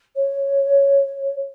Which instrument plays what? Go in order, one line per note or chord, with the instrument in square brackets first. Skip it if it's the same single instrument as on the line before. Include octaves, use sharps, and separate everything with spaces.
[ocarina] C#5